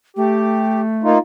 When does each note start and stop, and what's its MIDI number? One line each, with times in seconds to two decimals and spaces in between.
0.17 1.16 57
0.17 0.81 67
1.03 1.18 58
1.03 1.18 63
1.03 1.18 65